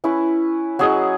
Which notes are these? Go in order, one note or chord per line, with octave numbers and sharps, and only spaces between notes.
C#4 E4 B4
F#3 C#4 G#4 D#5